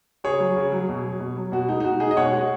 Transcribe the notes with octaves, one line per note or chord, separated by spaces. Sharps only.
C#3 G#4 C#5
F#3
C#3
F#3
B2
F#3
B2
F#3
B2 F#4
G#3 D#4
D#4
B2 F#4
G#3 D#4 G#4
D#5
B2 C#5 F#5
G#3